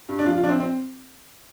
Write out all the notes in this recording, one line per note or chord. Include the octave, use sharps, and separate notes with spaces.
G2
D4
F3 F4
F4
F3 D4
C4
C4